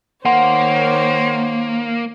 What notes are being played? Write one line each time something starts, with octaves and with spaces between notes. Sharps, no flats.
D#3 A#3 C5 C#5 F#5 C6